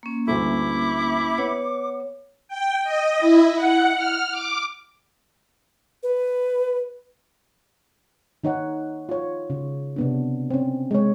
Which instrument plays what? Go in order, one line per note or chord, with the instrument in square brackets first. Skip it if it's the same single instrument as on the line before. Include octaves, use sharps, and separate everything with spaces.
[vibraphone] A#3 C#4
[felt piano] D2 G2 A3 [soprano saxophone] E4 [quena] D6
[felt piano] B3 [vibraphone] C#5
[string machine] G5
D#5
E4
F#5
F6
D6
[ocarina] B4
[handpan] D#3 D#4 C#5 F#5
F4 C#5
C#3
C3 B3 D4
C4 C#4
G#3 C#5